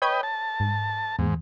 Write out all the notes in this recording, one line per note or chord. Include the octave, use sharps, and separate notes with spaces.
B4 C#5 D#5 G5 B5 G#6
A5
G#2
E2 G#2